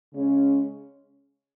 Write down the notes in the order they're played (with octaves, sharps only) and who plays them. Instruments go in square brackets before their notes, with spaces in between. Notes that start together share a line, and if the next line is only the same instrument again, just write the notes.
[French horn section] C#3 G#3 C#4